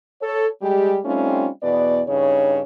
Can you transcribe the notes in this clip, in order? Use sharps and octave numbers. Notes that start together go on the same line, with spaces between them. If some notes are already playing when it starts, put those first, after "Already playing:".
A4 C#5
G3 G#3 G4
G3 A3 C4 C#4 D#4 F4
E2 B2 B3 B4 D5
G2 C#3 D#4 C#5